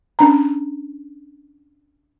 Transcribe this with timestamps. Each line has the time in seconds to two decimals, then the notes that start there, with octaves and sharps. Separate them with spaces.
0.19 C#4 D4 A#5